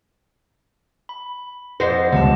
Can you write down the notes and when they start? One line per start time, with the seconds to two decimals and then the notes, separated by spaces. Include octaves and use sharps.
1.09 B5
1.80 F2 C5 D#5 F#5 A#6
2.13 C#2 G3 D#5 F#5 A5